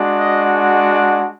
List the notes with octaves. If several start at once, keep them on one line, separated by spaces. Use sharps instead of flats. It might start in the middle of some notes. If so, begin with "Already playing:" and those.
Already playing: G#3 D4 F#4
D#5
F#5